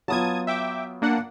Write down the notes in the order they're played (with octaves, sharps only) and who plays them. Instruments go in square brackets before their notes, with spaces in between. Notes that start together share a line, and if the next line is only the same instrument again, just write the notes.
[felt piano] F#3 B3 F4 [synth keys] A5 D#6 G#6
[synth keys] E5 G5 D6
A#3 D4 F#5